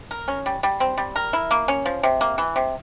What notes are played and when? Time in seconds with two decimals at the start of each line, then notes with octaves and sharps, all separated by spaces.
0.11 A#4
0.28 C#4
0.46 G3
0.63 G3
0.80 C4
0.98 G3
1.16 A#4
1.33 E4
1.51 A#3
1.68 C#4
1.86 F3
2.03 C3
2.21 A#3
2.38 E3
2.56 C3